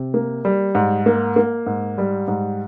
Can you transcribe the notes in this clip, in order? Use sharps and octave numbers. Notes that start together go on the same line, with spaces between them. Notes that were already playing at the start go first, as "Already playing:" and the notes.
Already playing: C3
A#3
G3
G#2
A#3
A#3
G#2
G3
G#2